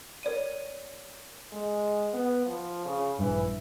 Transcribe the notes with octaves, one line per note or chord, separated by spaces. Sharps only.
A#4 C#5 D5 D#7
G#3
B3
F3
C#3
A#1 G2 E3